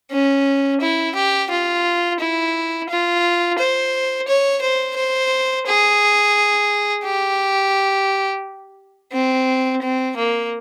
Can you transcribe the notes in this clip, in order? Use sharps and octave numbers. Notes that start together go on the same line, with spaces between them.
C#4
E4
G4
F4
E4
F4
C5
C#5
C5
C5
G#4
G4
C4
C4
A#3